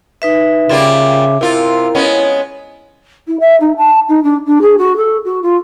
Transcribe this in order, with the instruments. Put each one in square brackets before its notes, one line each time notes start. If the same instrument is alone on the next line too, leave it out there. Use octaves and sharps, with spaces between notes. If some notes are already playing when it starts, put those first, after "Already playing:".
[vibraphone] D#4 B4 E5
[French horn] C#3 [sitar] G3 A#3 F4 [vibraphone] E5 D6
[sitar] C3 F4 [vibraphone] E4 [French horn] A#4
[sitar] G#3 B3 C#4
[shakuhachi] E4
E5
D#4
A5
D#4
D4
D4
G#4
F#4
A4
F#4
F4